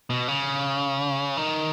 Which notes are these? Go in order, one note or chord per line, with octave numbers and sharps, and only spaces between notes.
B2
C#3
D#3